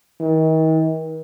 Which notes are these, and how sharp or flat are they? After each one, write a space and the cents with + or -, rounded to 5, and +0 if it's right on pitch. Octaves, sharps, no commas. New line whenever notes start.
D#3 +40